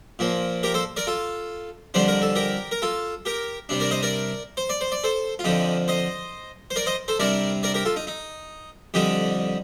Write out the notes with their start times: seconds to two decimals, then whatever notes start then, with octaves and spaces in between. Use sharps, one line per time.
0.19 A#2 F3 A#3
0.63 G4 A#4
0.74 A4 C5
0.96 A#4 D5
1.07 F4 A4
1.94 F2 D3 G3 D4 C5
2.08 A#4
2.22 A4
2.35 G4 A#4
2.71 A#4
2.82 F4 A4
3.25 G4 A#4
3.69 C3 G3 D4
3.80 A#4 D5
3.91 C5 D#5
4.02 A#4 D5
4.57 C5
4.69 D5
4.81 C5
4.92 D5
5.04 A4 C5
5.39 F4
5.44 F2 D3 F3 D#4 G4
5.88 C5 D#5
6.70 C5
6.76 A#4 D5
6.86 C5 D#5
7.08 A4 C5
7.19 C3 G3 D4 A#4 D5
7.63 A#4 D5
7.74 G4 A#4
7.85 F4 A4
7.96 D#4
8.07 D#4
8.94 F2 D3 G3 D#4 G4